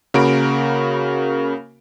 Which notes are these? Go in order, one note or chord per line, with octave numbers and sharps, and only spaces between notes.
C#3 A#3 F#4 A#4 B5 D7